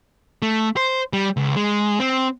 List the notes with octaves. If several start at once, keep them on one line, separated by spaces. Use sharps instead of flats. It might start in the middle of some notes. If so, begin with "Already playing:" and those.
A3
C5
G3
C#2
G#3
C4